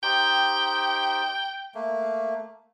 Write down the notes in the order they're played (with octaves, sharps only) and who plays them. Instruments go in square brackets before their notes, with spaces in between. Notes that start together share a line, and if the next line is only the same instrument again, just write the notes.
[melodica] D#4 G4 C5 [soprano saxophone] G5
[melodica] A3 A#3